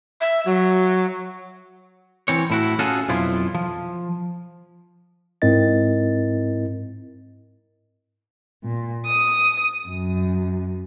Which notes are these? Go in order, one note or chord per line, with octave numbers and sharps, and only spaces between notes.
E5
F#3
E3 C4 C#5
A2 E4 F#4
C#4 F4 F#4 G#4 A4
B1 F2 F3 E4 F4
F3
G#2 C4 E4 A#4 D#5 A6
A#2
D#6
F#2